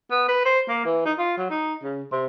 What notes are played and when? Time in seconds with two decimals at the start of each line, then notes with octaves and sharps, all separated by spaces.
0.11 B3
0.28 B4
0.45 C5
0.69 A#3
0.85 E3
1.05 D#4
1.18 F4
1.38 F#3
1.50 D#4
1.83 C#3
2.12 C3